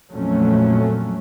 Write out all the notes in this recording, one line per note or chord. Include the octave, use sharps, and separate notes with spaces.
F2 A#2 F#3 A3 C#4